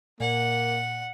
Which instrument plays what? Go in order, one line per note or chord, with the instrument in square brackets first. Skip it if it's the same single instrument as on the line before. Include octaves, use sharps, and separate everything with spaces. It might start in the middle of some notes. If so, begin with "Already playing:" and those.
[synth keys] A#2 [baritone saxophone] A#3 [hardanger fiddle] F#5